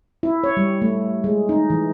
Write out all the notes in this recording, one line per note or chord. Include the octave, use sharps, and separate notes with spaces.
E4
C#5
G3
A3
G#3
D#4
E3